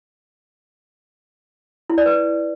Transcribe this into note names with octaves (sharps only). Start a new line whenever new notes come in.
E4
D5
B4